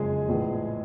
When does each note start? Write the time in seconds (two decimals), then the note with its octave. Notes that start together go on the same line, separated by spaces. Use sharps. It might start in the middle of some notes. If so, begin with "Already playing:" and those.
Already playing: F#1 F2 C#3 G#3 G#4
0.28 A#1 A2 E3